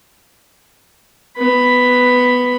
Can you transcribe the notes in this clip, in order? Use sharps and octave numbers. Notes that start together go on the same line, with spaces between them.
B3 B5